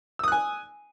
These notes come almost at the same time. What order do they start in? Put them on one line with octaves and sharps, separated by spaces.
E6 D#6 F#6 G#5